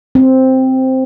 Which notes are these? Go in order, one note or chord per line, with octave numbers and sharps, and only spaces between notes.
C4